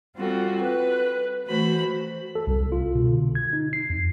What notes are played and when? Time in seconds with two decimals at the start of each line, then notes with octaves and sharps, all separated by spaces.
0.17 G3 C4 F4 F#4 A4
0.62 B4
1.46 E3 A3 F#4 C5 B5
2.35 A4
2.47 C2
2.72 F4
2.95 B2
3.10 D3
3.35 G#6
3.53 D#4
3.73 C7
3.90 F2